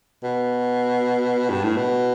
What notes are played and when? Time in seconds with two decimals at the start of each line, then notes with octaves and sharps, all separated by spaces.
0.23 B2
1.50 G2
1.64 A2
1.77 B2